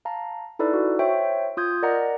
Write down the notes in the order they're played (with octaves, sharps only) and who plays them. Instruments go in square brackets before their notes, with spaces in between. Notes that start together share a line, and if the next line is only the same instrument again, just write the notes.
[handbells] F5 A5 A#5
D#4 E4 A4 B4 D5
F#4
C5 C#5 E5 G5 C#6
F4 D#6 G6 G#6
A#4 D5 D#5 F#5 A#5